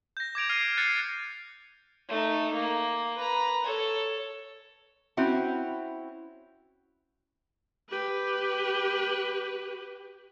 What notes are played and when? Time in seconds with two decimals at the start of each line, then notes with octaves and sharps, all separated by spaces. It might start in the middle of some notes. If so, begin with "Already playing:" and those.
0.17 G6 A#6
0.35 D6 G#6 D7 F7
0.49 F6 G#6 C7 D#7
0.77 F6 F#6 A6 C7 C#7
2.08 A3 D#4
2.53 A#3
3.16 B4 A#5
3.64 A4 C#5
5.17 C4 C#4 E4 F#4
7.89 G4 B4